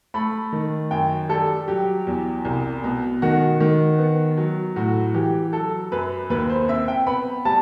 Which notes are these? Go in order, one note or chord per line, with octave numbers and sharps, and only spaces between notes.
A3 B5
D#3
F#2 G5
G3 A4
F#3 G4
E2
C2
B2
D#3 F#4
D#3
B3
F#3
A2 F#4
E3 G4
F#3 A4
F#2 B4
D#2 B4
C5
C4 E5
G5
B3 B5
G3 A5